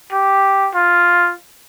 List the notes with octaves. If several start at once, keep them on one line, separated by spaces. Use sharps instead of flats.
G4
F4